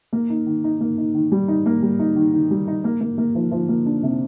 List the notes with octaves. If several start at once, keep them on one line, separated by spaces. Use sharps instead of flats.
A#3
D#4
D#3
D#4
A#3
D#4
D#3
G3
D#4
A#3
G3
D#4
D#3
D#3
G3
D#4
A#3
A#3
A#3
F3
F3
A#3
D4
C3